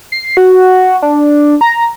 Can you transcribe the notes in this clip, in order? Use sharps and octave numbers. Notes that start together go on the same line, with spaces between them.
C7
F#4
D4
A#5